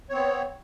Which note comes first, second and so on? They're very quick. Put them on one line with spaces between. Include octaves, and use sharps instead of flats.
C#5 C4 B3